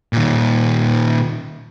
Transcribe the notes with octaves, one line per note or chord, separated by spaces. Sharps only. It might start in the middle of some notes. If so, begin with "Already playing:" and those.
A#2 D#3